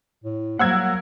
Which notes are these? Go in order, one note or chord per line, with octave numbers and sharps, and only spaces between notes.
A2
F#3 G3 A#3 A#4 F#5 E6 G#6